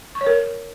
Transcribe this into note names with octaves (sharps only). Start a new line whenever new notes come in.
C#6
C#5
A#4